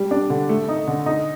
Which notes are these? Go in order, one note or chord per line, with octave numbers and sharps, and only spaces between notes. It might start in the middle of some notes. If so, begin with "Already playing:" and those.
Already playing: G3
D4
D3
A3
D#4
D3
D#4